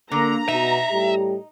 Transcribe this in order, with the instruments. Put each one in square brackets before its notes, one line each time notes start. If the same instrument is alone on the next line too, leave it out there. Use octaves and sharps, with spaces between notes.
[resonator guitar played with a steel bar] D3 [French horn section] A#3 [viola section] A#5
[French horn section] B2 [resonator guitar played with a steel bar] D#4 [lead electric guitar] E5
[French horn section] A2 G3 G4